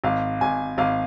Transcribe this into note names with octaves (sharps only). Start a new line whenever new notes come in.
G#1 F5
G#1 G#5
G#1 F5